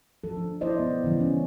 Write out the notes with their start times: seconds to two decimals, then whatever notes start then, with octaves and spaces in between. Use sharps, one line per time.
0.24 F3 A4
0.37 D4
0.61 A#3 E4 C5 D5 D#5
0.79 B3
1.04 C#3 E3 G3
1.20 C#4